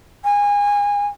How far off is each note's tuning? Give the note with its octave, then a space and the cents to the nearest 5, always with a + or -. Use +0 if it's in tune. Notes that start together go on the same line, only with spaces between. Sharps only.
G#5 -25